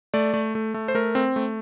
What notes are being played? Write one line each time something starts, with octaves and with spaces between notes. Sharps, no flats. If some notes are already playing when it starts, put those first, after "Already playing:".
A3 D5
A3
A3
A3
C5
A3 A#4
C4
A3